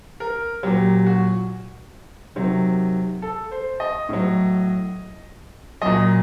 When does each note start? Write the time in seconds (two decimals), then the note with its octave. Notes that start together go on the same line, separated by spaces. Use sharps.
0.20 A#4
0.63 A#2 F#3 G4
1.06 F#4
2.36 C3 D#3 F#3
3.22 A4
3.51 C5
3.80 D#5
4.09 A2 F#3
5.81 A#2 F#3 D#5